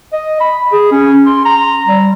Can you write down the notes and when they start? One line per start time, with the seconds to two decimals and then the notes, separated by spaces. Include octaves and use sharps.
0.13 D#5
0.40 B5
0.72 G#4
0.92 C#4
1.26 C6
1.45 A#5
1.87 G3